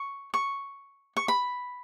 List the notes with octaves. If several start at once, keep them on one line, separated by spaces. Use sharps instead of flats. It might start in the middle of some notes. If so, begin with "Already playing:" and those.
Already playing: C#6
C#6
C#6
B5